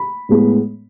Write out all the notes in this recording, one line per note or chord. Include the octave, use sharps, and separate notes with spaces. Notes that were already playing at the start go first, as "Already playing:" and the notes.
Already playing: B5
A2 G#3 B3